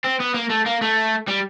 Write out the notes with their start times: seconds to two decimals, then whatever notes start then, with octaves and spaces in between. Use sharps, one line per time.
0.04 C4
0.20 B3
0.34 A#3
0.50 A3
0.66 A#3
0.82 A3
1.28 G3